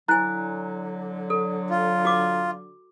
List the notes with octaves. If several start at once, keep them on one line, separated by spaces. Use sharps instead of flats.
D3 F#3 E4 G#5 A#5 F#6
A4
F4
F#4 D6